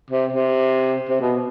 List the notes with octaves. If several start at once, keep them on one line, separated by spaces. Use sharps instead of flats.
C3
C3
C3
B2